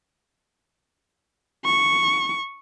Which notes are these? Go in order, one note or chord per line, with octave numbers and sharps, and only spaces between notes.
C#6